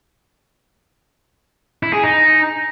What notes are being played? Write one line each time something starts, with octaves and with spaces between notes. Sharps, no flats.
E4
G#4
D#4